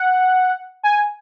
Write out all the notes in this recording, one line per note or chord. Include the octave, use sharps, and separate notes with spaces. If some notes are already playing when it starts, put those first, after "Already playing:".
Already playing: F#5
G#5